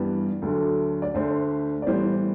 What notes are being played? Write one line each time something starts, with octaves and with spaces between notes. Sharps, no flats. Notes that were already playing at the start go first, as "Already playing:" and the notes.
Already playing: G2 E3 G3 B3
D2 D3 F#3 A3 A4
D5
D2 D3 A3 C5
D5
A2 E3 G3 B3 C5